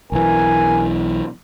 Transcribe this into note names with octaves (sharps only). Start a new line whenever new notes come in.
B1 E3 A#4 G#5